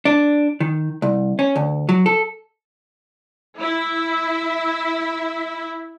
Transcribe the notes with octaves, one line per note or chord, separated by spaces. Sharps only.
D4
D#3
C2
C#4
D2
F#3
A4
E4 E5